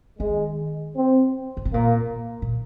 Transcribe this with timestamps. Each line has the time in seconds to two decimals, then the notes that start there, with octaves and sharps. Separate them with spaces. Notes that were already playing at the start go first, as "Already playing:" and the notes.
0.19 D#3 G#3
0.97 C4
1.57 D3
1.65 C3
1.74 A#2 A#3
2.42 A#2